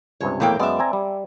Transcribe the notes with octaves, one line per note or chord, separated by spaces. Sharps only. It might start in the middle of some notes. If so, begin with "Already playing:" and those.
C#2 G2 C3 C#5
A#1 E2 A2 A3 A#3 G5
F#2 G#3 B3 D5 E5
C4 G#5 A#5
G3